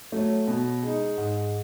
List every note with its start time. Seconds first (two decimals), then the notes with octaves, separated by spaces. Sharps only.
0.12 F#3 A3
0.47 B2
0.83 G#3 D#4
1.17 G#2